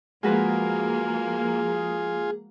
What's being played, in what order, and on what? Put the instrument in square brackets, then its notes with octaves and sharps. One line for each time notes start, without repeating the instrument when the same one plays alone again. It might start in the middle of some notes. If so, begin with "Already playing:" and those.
[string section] F3 A#3 [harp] G#3 F#4 B4 [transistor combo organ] F4 G#5 [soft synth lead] G#4